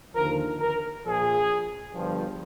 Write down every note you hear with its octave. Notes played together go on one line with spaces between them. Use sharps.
D#2 D3 F3 A#4
A#4
A#1 A#2 F3 G#4
G1 G2 F3